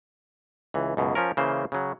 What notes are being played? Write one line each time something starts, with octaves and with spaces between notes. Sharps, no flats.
C#2 E3
C#2 F#2 B2
F3 C#4 A#4
C#3 E3 A#3 C5
C#3 F#3